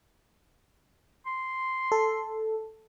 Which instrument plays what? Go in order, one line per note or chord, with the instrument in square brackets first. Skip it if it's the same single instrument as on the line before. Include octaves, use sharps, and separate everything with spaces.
[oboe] C6
[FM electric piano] A4